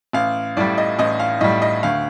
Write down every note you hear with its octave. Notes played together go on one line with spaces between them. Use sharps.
A1 F5
A2 G3 D5
D#5
A1 D#5
F5
A2 G3 D#5
D#5
D2 F5